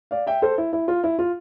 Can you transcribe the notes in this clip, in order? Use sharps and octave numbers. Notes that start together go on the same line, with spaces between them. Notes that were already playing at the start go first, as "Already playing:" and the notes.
D5 F5
E5 G5
A4 C5
E4
E4
F4
E4
F4